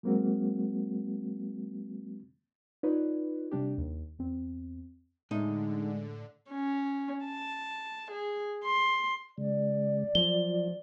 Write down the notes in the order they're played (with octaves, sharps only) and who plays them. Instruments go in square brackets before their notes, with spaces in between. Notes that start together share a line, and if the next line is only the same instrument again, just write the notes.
[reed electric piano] F#3 G#3 A#3 C4 F#4
[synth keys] D#4 F4 B4 C#5 D5
C3 G3 D4 G4
D#2
E2 C4
[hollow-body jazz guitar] A2 [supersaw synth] D3 [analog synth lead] G#3 [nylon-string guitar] D#4
[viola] C#4
A5
G#4
C6
[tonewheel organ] C#3 G#3 [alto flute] D5
[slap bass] F3 [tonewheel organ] F#3 F4 [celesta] G7